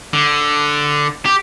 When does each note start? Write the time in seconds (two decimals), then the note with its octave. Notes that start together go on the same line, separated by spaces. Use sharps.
0.13 D3
1.25 G4